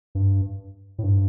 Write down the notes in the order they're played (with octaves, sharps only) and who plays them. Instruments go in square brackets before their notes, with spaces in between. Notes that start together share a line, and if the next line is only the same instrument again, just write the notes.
[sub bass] G2
A2
G2